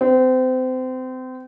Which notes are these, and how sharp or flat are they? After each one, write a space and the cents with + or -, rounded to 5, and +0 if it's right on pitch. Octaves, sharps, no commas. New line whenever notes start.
C4 -30